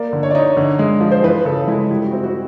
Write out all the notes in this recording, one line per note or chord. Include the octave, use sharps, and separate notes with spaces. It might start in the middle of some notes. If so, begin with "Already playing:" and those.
Already playing: A#3 D5
D3
C#5
D5
D#4 C#5
D3
G#3
F3
C5
E3 B4
C#3 A4
G#3 E4
G3 E4
F#4
C4
F#4